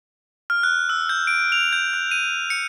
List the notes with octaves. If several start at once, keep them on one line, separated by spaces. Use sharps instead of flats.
F6
F#6
E6
G6
D7
F7
G6
F#6
D#7
C#7